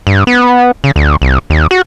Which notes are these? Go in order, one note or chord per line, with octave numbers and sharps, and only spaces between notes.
G2
B3
C#3
D2
C2
D#2
F#4